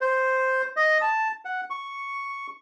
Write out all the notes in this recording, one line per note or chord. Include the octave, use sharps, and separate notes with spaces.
C5
D#5
A5
F#5
C#6